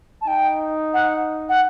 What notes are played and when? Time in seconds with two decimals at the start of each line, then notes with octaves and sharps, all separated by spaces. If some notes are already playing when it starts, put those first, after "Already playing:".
0.21 A5
0.27 D#4 G5
0.94 F#5
1.49 F#5